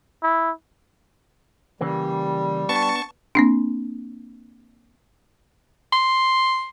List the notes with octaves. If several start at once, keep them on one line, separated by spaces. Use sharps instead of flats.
E4
C#3 E3 G3 A#3
B3 D4 A5 C#6
A#3 C4 D4
C6